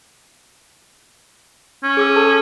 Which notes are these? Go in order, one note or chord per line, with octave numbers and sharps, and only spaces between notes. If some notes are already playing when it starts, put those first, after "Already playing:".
C#4
G#4 D6 E6
A4 A5